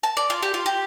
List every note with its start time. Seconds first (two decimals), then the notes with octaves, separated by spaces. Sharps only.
0.03 A5
0.17 D5
0.30 F4
0.43 G4
0.54 F4
0.66 G4